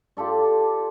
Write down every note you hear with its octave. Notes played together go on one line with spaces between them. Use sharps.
F4 G4 A4 D5